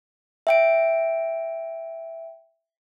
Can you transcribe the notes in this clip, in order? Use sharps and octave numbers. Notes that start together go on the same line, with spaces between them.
E5 G5 D7